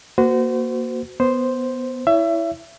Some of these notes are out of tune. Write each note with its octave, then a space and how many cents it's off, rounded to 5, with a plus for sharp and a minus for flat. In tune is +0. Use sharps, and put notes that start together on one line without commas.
A#3 +10 F#4 +0 C5 -30
B3 +0 C5 +0
E4 +0 C#5 +30 E5 +25